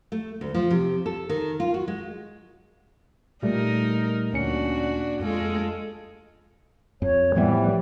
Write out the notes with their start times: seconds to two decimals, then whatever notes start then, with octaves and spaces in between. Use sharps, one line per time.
0.12 A3
0.41 D2
0.54 F3
0.71 C3
1.06 A4
1.29 D#3
1.60 F4
1.74 F#4
1.88 G#3
3.43 A#2 G3 A3 D#4 A#4
4.33 D2 A#2 C#4 D4 F#4 C#7
5.20 F2 G#3 F4 A4
7.02 F2 C#5
7.35 A2 E3 F3 G3 B3